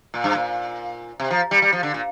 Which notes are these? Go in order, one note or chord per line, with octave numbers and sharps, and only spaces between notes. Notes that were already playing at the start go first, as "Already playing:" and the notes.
A#2
G2
A#2
C3
F3
G3
G3
F3
D3
A#2